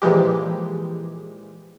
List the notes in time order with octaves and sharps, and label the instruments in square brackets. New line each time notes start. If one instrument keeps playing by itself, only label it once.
[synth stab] A#2 E3 F3 G#3 G4